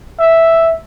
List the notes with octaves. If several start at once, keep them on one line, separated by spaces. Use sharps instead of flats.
E5